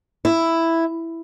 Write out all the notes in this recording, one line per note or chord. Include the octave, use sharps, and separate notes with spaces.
E4